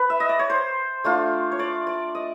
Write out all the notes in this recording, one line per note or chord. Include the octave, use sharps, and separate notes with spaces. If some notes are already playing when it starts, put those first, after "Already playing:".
Already playing: B4
E5
D#5
D5
C#5
C5
A3 D4 F4
C#5
D5
D5
D#5